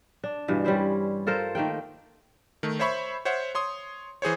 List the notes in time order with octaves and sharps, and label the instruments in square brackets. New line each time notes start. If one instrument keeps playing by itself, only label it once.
[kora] D4
G2 B2 E3
G3 C#4 E4 C5
F4 A4 A#4 C5
D#3 A3 A#3 G5
[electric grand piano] D#3 A3
C5 C#5 E5 B5 C#6
C5 C#5 E5 F#5
C#5 C6 D#6
E3 G#4 C5 C#5